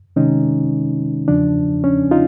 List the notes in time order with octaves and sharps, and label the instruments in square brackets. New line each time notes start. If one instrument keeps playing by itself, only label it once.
[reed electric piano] C3 D#3 G#3 C#4 D#4
E2 C#3 F3 D4
C#4
D#4 F4